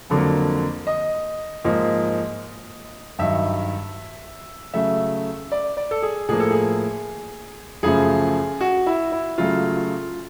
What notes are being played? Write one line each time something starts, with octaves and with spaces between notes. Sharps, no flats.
F2 D3 F#3 A#3
D#5
G#2 F3 A#3
G2 D#3 F#3 E5
C#3 F#3 A3 E5
D5
D5
A4
G#4
A2 F3 A#3 G#4
A4
G#4
F#2 C#3 F3 A3 G#4
F#4
E4
E4
C#3 F#3 A3 F4
F4